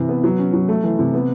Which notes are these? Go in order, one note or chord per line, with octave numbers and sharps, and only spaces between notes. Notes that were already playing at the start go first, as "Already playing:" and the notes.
Already playing: C3 E3
B3
F#3
C#4
F#3
A3
E3
C3
B3